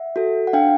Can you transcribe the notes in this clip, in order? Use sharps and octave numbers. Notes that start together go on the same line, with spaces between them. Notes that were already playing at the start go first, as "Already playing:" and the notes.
Already playing: E5 F#5
F#4 A4
F#5
D4 F5 G5